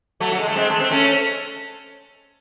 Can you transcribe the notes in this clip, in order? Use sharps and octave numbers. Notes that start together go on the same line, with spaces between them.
F#3 A3
F#3
G#3
A3
G#3 C4
A3
C4
A3 C#4